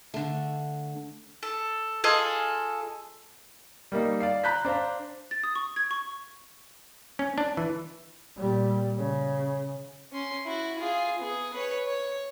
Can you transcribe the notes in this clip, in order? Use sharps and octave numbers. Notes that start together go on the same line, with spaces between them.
D3 A3
A4
F4 G#4 A4 D#5
G3 A#3 D#4
D5 F5 C7
A#5 B5 F#6 G6 B6
D4 C5 D5 F5 A#5
A6
D#6
C#6
G#6
C#6
C#4
D4
E3
A#2 G3
C#3
C#4 C6
E4 F#4
F4 G#4
B3 G#4
B4 C#5
C#5